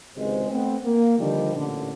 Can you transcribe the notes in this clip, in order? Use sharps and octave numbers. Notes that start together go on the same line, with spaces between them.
G#1 C#2 C3 G#3 C5
A3 B3 C4
A#3
D3 D#3 F3 G3
A1 A#2 D3